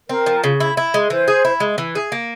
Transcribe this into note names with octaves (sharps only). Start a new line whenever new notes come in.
C4 A#4
F3
C#3
E4
E4
G#3
E3 C5
G#4
E4
G#3
E3
G#4
A#3